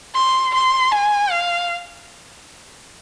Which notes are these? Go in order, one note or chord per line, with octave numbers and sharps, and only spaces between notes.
C6
C6
G#5
F5